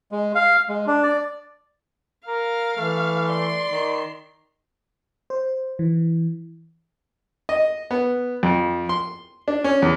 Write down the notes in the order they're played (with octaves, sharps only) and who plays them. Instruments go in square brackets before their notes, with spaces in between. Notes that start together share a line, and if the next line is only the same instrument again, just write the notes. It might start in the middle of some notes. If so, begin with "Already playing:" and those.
[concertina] G#3
F5
G#3
D4
D5
[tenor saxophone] A#4 [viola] F5
[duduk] E3 [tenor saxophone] A3
[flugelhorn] D5 [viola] C6
[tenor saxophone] D#3
[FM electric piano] C5
E3
[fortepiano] D#5
B3
F2
C6
D4
C#4
E2